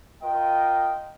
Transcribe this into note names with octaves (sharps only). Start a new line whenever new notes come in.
F4 A#4 D#5 G5